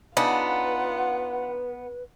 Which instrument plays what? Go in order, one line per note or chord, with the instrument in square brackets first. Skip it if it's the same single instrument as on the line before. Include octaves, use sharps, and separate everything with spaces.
[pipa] C#3 D4 D#4 [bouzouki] B3 [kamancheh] F4 F#5 [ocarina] B4